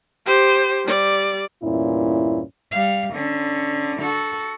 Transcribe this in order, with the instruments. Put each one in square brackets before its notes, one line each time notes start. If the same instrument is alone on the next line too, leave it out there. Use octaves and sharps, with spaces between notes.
[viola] G4 C5
G3 D5
[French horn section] E2 G2 A#2 C#4 E4
[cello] G3 F5
D3 C#4
F#4 A4